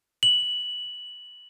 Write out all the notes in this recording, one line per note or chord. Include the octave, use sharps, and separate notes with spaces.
F#7